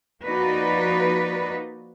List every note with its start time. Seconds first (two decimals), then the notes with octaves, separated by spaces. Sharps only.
0.24 F3 A#3 D#4 F#4 B4 D5